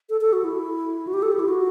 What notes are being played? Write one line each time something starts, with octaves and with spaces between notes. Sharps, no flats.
A4
A4
F#4
E4
F#4
G4
A4
G4
E4
F#4